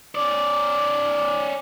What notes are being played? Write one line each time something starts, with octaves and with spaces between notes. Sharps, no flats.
C#4 D5